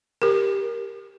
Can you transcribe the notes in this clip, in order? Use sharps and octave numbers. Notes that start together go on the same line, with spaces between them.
G4 A#4